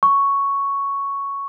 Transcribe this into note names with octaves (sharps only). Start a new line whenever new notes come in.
C#6